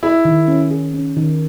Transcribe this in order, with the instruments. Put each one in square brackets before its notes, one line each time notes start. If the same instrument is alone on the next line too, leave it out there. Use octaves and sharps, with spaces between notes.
[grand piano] E4 [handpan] G#4
[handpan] D#3
C#4
G#4
C#4
D#3